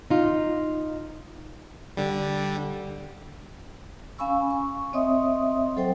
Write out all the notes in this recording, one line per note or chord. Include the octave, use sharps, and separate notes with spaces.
D#4 F4
D3 G3
C#4 F5 G#5 B5 C#6 E6
C#6
C4 C#5 D#5 E5 C6 D#6
F#3 A4 C5 G5